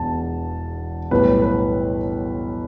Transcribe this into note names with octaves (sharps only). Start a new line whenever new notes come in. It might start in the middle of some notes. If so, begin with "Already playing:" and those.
Already playing: E1 E2 A5
B1 A2 G3 B4
B4